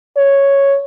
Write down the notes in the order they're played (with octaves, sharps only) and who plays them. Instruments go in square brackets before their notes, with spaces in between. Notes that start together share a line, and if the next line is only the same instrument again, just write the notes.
[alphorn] C#5